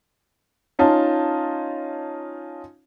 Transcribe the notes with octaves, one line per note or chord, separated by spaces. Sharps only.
C#4 D#4 F4 A5